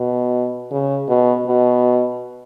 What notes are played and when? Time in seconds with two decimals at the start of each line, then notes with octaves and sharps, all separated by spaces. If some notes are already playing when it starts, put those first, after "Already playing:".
Already playing: B2
0.71 C#3
1.08 B2
1.48 B2